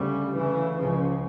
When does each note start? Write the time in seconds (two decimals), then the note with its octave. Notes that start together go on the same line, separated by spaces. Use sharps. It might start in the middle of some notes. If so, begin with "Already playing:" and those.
Already playing: D2 C#3 G3
0.35 D2 C#3 E3
0.77 C#2 C#3 F3